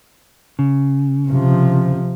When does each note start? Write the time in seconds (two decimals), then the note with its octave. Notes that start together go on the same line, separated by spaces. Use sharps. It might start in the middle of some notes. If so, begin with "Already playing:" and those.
0.59 C#3
1.28 C3 F3